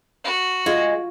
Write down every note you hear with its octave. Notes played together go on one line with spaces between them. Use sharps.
F#4
G#3 F4